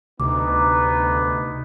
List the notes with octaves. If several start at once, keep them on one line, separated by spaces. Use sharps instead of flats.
D2 C3 B3 D#4 D6